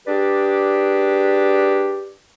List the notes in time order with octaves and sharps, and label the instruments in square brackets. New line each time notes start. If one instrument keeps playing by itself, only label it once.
[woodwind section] D4 G4 G#4 B4 D5